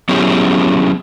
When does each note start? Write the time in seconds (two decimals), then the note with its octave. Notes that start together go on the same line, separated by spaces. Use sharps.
0.09 F#3 B3 C#4 E4 G4 G#4